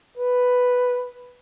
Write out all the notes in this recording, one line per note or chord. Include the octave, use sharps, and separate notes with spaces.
B4